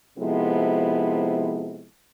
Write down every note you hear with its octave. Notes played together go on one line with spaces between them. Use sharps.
C3 F3 G#3 B3 E4 A4